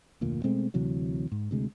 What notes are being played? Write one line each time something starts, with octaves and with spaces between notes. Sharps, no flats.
F1 D2 A#2
B2 G#3 A3 C4
D2 C3 E3 F#3
G#2
D2 C3 G#3